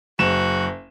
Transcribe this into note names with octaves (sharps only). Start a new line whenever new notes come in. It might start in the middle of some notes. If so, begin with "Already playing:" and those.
F#1 F#4 E7